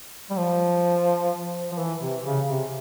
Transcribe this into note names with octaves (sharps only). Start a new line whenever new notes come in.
G3
F3
F3
E3
C3
C#3
C3